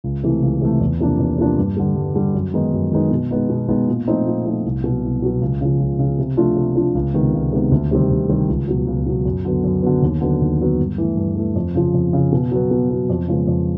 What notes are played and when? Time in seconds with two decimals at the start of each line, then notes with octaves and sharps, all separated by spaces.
0.04 C#2
0.24 C3 E3 A3
0.42 C#2
0.62 C3 E3 A3
0.81 E2
1.00 C3 F3 A#3 D4
1.19 E2
1.38 C3 F3 A#3 D4
1.58 G2
1.77 D3 G3
1.96 G2
2.15 D3 G3
2.34 F#2
2.54 D#3 G#3 B3 D#4
2.73 F#2
2.92 D#3 G#3 B3 D#4
3.11 B2
3.31 G#3 B3 D#4
3.50 B2
3.69 G#3 B3 D#4
3.88 A#2
4.07 F3 A3 C4 D#4
4.27 A#2
4.45 F3 A3 C4 D#4
4.65 C2
4.84 B2 F#3
5.03 C2
5.22 B2 F#3
5.41 C#2
5.61 C#3 F3
5.80 C#2
5.99 C#3 F3
6.19 C3
6.37 F3 A3 D4 F4
6.57 C3
6.76 F3 A3 D4 F4
6.95 C#2
7.14 C3 D#3 G#3 B3
7.33 C#2
7.53 C3 D#3 G#3 B3
7.71 D2
7.91 C3 D#3 G3 C4
8.11 D2
8.29 C3 D#3 G3 C4
8.48 C#2
8.68 B2 F#3
8.87 C#2
9.06 B2 F#3
9.25 F#2
9.45 D3 F#3 B3
9.64 F#2
9.82 D3 F#3 B3
10.02 D#2
10.21 D3 F#3 B3
10.41 D#2
10.60 D3 F#3 B3
10.79 G2
10.98 E3 A3
11.17 G2
11.37 E3 A3
11.56 F2
11.75 C#3 F3
11.94 F2
12.13 C#3 F3
12.33 B2
12.51 F#3 B3
12.71 B2
12.90 F#3 B3
13.10 F2
13.28 C#3 F3 G#3 B3
13.48 F2